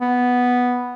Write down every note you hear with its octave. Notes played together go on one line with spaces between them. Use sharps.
B3